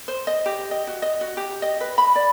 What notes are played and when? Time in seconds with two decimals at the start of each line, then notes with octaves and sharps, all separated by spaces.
0.08 C5
0.27 D#5
0.46 G4
0.71 D#5
0.87 F#4
1.02 D#5
1.21 F#4
1.37 G4
1.62 D#5
1.81 B4
1.98 B5
2.16 D5